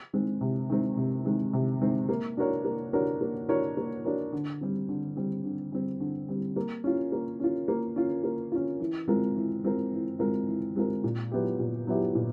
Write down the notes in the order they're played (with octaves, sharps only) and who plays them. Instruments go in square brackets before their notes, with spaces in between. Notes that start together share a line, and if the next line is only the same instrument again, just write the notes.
[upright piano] D#3 G#3 C4
C3
D#3 G#3 C4
C3
D#3 G#3 C4
C3
D#3 G#3 C4
A#3
D4 F#4 A#4 C#5
A#3
D4 F#4 A#4 C#5
A#3
D4 F#4 A#4 C#5
A#3
D4 F#4 A#4 C#5
D3
G3 C4
D3
G3 C4
D3
G3 C4
D3
G3 C4
A#3
C#4 F4
A#3
C#4 F4
A#3
C#4 F4
A#3
C#4 F4
E3
G#3 C4 F4 A#4
E3
G#3 C4 F4 A#4
E3
G#3 C4 F4 A#4
E3
G#3 C4 F4 A#4
A#2
F#3 B3 E4 G4
A#2
F#3 B3 E4 G4
A#2